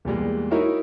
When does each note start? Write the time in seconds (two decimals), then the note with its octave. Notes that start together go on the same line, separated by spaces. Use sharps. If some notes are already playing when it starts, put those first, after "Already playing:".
0.05 E2 A#2 G3 G#3
0.51 D#4 E4 F#4 A#4 C#5 E5